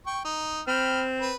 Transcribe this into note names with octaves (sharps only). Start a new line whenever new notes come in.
G5 C#6
D#4
C4 G5 B5 F6
B4